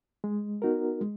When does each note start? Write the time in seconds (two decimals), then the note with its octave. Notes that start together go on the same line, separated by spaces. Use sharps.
0.24 G#3
0.62 B3 D#4 F#4 A#4
1.01 G#3